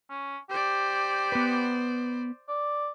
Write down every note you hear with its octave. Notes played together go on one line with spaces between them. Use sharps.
C#4
G4 C5 D5
B3 B4
D5